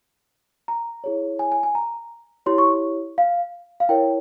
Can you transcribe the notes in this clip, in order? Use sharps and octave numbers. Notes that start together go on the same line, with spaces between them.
A#5
E4 G#4 C#5
G#5
G#5
G#5
A#5
E4 G4 C#5 C6
C#6
F5
F5
E4 A#4 C#5 G5